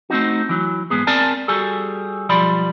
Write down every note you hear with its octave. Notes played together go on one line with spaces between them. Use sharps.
A3 C4 D4 D#4 F#4
E3 F#3
G#2 G#3 B3 G#4
C4 A#4 D5 G#5 A5
G3 F#4 G#4 A4
B1 F3 G3 D5 B5 C6